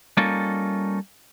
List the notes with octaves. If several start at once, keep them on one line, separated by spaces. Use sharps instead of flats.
G3 A#3 C#4 D#4 F4 A4